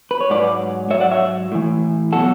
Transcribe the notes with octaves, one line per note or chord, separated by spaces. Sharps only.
B4
C#5
G#2 F#3 B4 D5
G#2 F#3 C#5 E5
D5 F#5
C#5 E5
A2 E3
B2 F#3 F#4 A4